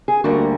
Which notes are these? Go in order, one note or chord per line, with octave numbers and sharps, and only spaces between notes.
G#4
D2 D3 G3 A#3 F#4